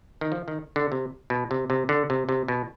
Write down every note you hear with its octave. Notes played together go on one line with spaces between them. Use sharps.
D#3
F3
D#3
D3
C3
B2
C3
C3
D3
C3
C3
B2